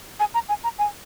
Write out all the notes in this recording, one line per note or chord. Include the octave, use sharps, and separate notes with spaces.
G#5
A#5
G#5
A#5
G#5